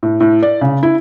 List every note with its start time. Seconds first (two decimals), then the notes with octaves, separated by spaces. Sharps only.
0.03 A2
0.20 A2
0.43 D5
0.61 C#3
0.83 E4